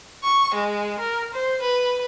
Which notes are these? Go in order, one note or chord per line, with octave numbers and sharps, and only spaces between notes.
C#6
G#3
A#4
C5
B4